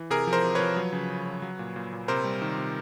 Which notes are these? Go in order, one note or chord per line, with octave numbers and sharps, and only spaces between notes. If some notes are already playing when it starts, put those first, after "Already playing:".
Already playing: E3
C3 G#4 A#4
F3
A#4 C5
C3
F3 B4 C#5
F#3
C#3
C#3
F#3
F#3
A#2
A#2
A#2
C3 A#4 C5
G3
D#3
C3